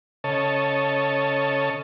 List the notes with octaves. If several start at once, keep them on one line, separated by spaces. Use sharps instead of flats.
C#3 A4 C#5 D#5 A5